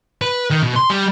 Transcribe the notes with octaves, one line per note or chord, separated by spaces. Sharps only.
B4
D#3
B2
C6
G3